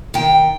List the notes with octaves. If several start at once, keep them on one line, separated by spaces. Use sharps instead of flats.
D#3 G5